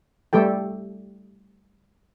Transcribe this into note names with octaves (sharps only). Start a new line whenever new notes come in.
G3 A3 G4 A4 G5